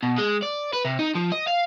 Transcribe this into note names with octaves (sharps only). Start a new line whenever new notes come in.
B2
G#3
D5
B4
C3
D#4
F3
D#5
F5